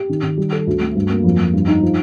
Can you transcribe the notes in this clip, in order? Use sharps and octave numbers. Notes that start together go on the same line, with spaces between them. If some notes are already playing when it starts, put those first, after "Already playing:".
Already playing: G4
D#3
D#3
G3
A4
D2
A3
G2
A#3
F2
F2
G2
D#4
F3